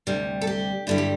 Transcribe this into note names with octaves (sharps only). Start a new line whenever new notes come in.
D2 C3 G3
A4
G4
G2 D3 G3 E4
G4